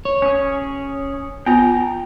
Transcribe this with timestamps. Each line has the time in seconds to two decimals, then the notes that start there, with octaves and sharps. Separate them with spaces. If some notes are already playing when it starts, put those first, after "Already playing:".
0.05 C#5
0.22 C#4 G#4
1.46 B3 F4 G5 A#5